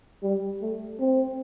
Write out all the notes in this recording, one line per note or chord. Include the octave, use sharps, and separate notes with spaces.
G3
A3
C4